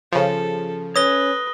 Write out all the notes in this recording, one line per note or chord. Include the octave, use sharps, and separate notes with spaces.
C#3 F3 A4
C#4 B4 C#5 D#6 A#6 G7